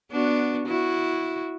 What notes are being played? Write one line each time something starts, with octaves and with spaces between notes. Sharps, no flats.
B3 D4 F#4
E4 F#4